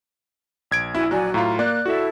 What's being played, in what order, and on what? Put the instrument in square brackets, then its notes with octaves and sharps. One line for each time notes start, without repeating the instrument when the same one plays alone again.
[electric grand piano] A#1 G#6 D7
[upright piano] E4 [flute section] F#4 G#5
[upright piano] F#3 [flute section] F#4 D5 G#5
[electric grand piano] A2 F4 [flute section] F5 A#5
[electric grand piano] A#3 [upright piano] D5 [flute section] F#6
[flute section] E4 A4 [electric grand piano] F#4 E5